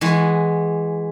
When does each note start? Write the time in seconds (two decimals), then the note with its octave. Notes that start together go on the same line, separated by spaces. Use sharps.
0.01 E3 G#3 F#4